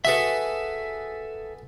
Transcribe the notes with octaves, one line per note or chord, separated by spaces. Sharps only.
F#4 G#4 A4 B4 E5